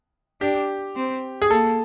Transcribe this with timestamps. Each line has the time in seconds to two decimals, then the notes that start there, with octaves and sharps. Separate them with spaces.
0.41 D4 G4
0.96 C4
1.42 G#4
1.51 A#3 A4